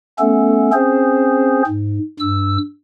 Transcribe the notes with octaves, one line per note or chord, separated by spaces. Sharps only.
A3 B3 C#4 A4
C4 C#4 G#4 C5
G#2
G2 E6